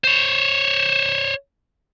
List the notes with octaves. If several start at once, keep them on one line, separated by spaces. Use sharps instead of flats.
C5 C#5